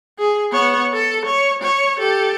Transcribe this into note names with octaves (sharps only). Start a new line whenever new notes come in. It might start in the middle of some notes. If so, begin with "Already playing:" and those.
G#4
B3 C#5
A4
C#5
C#5
G4 A4